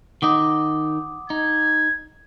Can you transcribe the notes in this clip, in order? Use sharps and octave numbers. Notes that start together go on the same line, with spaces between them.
D#3 D#4 F#5 D6 D#6
D#4 G#6